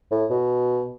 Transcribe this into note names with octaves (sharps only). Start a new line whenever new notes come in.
A2
B2